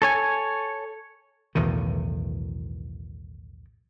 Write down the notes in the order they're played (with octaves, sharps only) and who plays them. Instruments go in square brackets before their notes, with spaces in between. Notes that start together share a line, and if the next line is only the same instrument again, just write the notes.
[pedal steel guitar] A4 C#5 G#5
[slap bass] B1 E2 A2 D#3